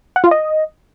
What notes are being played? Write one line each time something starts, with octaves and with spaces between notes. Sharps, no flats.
F#5
F4
D#5